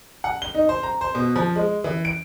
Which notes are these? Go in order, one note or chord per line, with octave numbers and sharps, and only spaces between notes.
F#5
G7
D#4
C5
A#5
C5
B2
F3
G#3
E3
D7